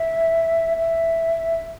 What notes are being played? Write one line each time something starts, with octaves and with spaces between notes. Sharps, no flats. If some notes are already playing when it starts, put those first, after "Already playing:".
Already playing: E5
E5